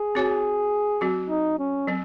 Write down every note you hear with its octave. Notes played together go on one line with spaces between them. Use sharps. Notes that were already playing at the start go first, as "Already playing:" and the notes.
Already playing: G#4
C4 F#4 C#5
F#3 C4 F#4
D#4
C#4
F#3 C4